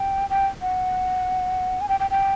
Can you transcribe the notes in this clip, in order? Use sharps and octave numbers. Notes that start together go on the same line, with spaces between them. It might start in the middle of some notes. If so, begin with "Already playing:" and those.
Already playing: G5
G5
F#5
G#5
G5
G5
G5